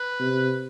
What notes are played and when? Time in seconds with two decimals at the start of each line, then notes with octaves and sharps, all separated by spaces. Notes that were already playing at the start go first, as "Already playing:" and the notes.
Already playing: B4
0.20 C3